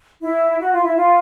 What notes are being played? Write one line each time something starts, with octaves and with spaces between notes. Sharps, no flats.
E4
F#4
F4
E4
F4